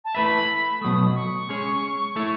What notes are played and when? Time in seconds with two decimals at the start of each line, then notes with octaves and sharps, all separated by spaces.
0.05 A5
0.15 A3 E4 B4 E5 B5
0.81 B2 F#3 A3 D#6
1.15 C#6
1.49 G#3 C#4 G#4 C#5
2.16 A3 E4 A4 C#5